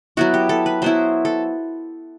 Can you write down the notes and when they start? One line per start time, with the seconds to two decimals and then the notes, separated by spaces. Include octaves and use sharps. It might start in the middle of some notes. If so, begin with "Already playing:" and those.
0.17 F#3 B3 E4 F#4
0.34 G4
0.49 A4
0.66 B4
0.82 F#3 B3 E4 C5
1.25 A4